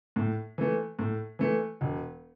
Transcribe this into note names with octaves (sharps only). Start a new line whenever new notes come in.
A2
E3 A3
A2
E3 A3
E1